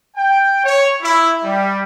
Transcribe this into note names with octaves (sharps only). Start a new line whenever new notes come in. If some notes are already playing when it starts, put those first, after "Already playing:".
G5
C#5
E4
G3